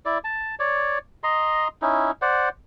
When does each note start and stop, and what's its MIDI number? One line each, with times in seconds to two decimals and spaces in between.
0.05 0.18 64
0.05 0.18 74
0.24 0.55 81
0.59 0.98 73
0.59 0.98 74
1.24 1.68 75
1.24 1.68 82
1.24 1.68 84
1.82 2.11 61
1.82 2.11 63
1.82 2.11 64
2.22 2.49 72
2.22 2.49 74
2.22 2.49 78